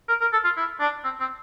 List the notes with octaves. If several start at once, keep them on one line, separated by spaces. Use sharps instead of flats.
A#4
A#4
A4
F4
E4
D4
C4
C4